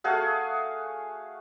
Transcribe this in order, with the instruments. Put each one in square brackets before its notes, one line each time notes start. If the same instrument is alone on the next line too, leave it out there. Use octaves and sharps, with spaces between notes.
[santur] A3 F#4 G#4 F5